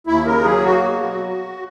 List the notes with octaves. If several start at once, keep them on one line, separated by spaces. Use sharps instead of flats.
D#2 E4
C#3 A#4
F#3 G#4
A#3 F#4
B2
F#3